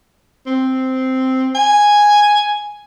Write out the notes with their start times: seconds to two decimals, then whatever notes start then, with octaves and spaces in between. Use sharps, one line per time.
0.46 C4
1.55 G#5